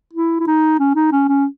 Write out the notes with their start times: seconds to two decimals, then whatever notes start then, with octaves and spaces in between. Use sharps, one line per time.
0.13 E4
0.40 E4
0.47 D#4
0.79 C#4
0.95 D#4
1.12 C#4
1.28 C#4